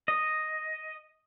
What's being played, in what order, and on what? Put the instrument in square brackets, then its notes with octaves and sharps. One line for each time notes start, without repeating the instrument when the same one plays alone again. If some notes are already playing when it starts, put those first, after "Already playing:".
[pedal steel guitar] D#5